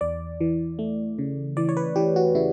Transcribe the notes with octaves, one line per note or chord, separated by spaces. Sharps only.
E2 D5
E3
A3
C#3
E3 D5
C#5
B4
E3 G4
F#4
C#3 E4